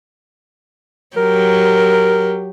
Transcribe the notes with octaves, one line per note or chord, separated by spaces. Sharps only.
F#3 G4 A#4